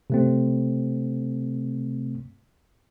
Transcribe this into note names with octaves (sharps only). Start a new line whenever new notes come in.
C3 A3 C4